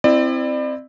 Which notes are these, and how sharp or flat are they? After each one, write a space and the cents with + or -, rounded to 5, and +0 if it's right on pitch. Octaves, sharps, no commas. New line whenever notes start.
C4 +0 E4 +5 D5 +35